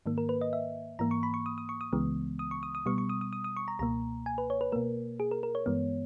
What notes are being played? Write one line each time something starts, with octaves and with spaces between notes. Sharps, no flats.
G#2 D#3 A#3
A#4
B4
D#5
E5
G#2 E3 A#3 A#5
C#6
B5
C#6
D#6
D#6
C#6
D#6
C#2 C#3 E3 G#3 B3
D#6
C#6
D#6
D#6
B2 G3 B3 C#6
C#6
D#6
D#6
D#6
D#6
C#6
A#5
C#2 B2 A#3 A#5
G#5
B4
C#5
B4
B2 A#3 A#4
G#4
A#4
A#4
C#5
G2 E3 G#3 B3